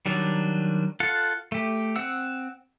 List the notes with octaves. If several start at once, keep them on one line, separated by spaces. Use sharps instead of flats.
D#3 F#3 G3 D4
F4 A4 F#5
A3 G4
C4 F#5 E6